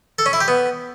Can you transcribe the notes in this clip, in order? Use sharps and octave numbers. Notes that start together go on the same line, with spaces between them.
A4
C#4
E4
G4
B3